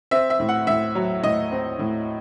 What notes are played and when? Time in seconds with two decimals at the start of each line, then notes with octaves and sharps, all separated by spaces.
0.11 C4 E5
0.30 E5
0.40 A2
0.49 F#5
0.67 A2 E5
0.95 F#3
1.23 A2 D#5
1.52 C4
1.79 A2